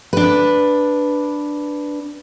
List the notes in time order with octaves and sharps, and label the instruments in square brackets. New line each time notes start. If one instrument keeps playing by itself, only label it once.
[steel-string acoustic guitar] D4 B4